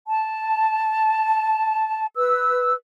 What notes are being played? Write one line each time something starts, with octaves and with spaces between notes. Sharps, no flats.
A5
B4 E6